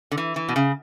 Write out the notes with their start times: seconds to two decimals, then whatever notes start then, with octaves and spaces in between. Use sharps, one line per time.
0.11 D3
0.17 E3
0.36 E3
0.49 B2
0.56 C#3